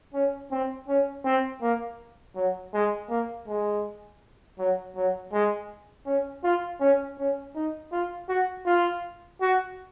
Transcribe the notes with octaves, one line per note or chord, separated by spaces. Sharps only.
C#4
C4
C#4
C4
A#3
F#3
G#3
A#3
G#3
F#3
F#3
G#3
C#4
F4
C#4
C#4
D#4
F4
F#4
F4
F#4